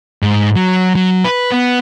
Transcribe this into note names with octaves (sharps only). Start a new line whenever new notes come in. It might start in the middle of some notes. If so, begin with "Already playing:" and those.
G#2
F#3
F#3
B4
B3